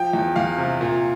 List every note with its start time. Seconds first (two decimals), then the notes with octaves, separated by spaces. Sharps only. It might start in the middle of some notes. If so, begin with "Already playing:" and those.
Already playing: F3 G5
0.13 E2
0.36 E2 F5
0.58 C3
0.81 A#2